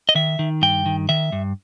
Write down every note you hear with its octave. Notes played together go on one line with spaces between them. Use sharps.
D#5
D#3 E5
D#3
G2 G5
D#3
D#3 E5
G2